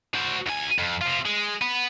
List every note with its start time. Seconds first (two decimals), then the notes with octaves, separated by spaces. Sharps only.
0.14 F#4 C5
0.47 D2 G#5
0.79 F2
1.01 C3 F4
1.26 G#3
1.62 B3